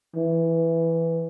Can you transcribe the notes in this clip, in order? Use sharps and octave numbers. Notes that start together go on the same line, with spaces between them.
E3